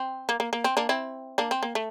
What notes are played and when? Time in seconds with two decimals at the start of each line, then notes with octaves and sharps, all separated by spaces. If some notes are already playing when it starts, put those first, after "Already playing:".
Already playing: C4
0.29 A#3
0.40 A#3
0.53 A#3
0.64 C4
0.77 A#3 D4
0.89 C4 E4
1.38 A#3 D4
1.51 C4
1.63 A#3
1.75 A3